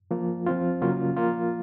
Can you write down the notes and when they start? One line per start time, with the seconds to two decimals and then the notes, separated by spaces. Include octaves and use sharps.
0.11 F3 A#3 F4
0.46 F3 C4 F4
0.81 C#3 F#3 A#3 C#4 F4
1.17 F3 A#3 F4